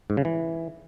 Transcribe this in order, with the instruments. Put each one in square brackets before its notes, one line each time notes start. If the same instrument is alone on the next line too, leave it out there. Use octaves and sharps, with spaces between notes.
[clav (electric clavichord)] G#2
C#3
E3